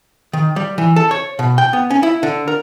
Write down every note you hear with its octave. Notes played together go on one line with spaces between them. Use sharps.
D#3
G3
E3
A4
C#5
B2
G5
B3
C#4
E4
D3
A#4